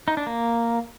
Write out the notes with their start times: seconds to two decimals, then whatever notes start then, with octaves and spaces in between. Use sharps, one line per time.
0.08 D#4
0.17 D4
0.27 A#3